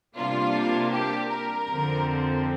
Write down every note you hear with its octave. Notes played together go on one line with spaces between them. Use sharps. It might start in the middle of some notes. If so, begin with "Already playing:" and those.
C3 G3 A#3 D4 F4
G4
A#4
F2 D3 F3 C4